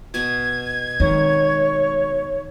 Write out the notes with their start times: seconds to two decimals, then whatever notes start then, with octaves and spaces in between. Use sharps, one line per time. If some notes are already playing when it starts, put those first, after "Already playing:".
0.14 B2 G#6
1.00 D#3 G#3 C4 C#5